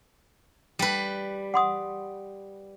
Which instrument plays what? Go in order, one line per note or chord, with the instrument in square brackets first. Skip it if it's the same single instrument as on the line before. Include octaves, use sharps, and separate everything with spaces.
[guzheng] G3 B4
[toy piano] F#5 C6 D#6